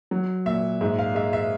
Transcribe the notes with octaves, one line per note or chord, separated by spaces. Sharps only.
F#3
A#2 E5
G#2 E5
F5
G#3 E5
E5